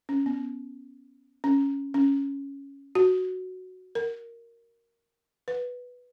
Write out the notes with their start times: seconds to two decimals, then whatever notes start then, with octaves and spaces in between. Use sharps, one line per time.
0.09 C#4
0.26 B3
1.44 C#4
1.94 C#4
2.95 F#4
3.95 A#4
5.48 B4